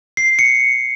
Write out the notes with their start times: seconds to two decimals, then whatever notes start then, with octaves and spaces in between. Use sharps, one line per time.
0.17 C7
0.39 C#7